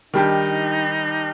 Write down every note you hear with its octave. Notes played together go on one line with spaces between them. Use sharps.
D#3 G3 D4 D#4 G4